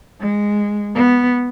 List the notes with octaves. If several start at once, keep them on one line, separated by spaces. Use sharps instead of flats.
G#3
B3